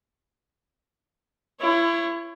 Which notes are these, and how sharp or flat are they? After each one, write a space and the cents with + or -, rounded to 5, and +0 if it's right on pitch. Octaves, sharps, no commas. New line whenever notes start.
E4 +35 C#5 -10